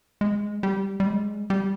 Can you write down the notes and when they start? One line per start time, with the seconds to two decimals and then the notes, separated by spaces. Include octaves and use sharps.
0.21 G#3
0.63 G3
1.00 G3
1.07 G#3
1.50 G3